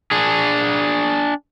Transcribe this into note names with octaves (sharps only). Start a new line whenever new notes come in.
D4 G#4